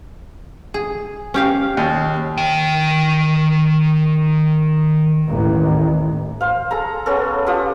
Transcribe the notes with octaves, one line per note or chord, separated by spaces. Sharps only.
G#4
C#4 G4 F5
D#2
D#3 G5
A1 D#2
C5 F5
G#4 A4 A#5
B3 C#4 G#4 A4
F4 G4 F#5 D#6